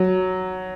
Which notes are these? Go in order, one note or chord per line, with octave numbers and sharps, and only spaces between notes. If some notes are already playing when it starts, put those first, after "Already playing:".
Already playing: F#3